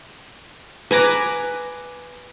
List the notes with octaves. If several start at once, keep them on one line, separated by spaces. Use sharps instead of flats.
B4 G#5 A#5 D6